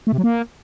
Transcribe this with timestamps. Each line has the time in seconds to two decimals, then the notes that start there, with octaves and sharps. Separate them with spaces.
0.07 A3
0.12 C3
0.18 F#3
0.24 A#3